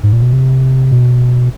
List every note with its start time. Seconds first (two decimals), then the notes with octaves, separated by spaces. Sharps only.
0.03 G#2
0.13 A#2
0.22 B2
0.33 C3
0.91 B2